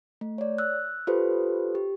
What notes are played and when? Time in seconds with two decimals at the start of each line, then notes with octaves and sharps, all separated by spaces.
0.21 A3
0.38 C#5 D5
0.58 E6 F#6
1.07 F4 G4 A4 B4 C5
1.75 G4